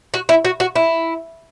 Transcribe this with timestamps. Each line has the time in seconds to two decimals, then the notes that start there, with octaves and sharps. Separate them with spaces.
0.14 F#4
0.29 E4
0.45 F#4
0.60 F#4
0.76 E4